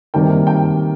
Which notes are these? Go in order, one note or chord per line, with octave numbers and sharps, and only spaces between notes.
C3 D#3 G3 A#3 G5
G5